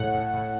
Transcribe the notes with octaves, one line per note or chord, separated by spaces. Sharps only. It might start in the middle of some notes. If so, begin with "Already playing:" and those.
Already playing: A2 F#5
A2
A2